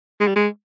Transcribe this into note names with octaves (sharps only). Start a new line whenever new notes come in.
G#3
G3
G#3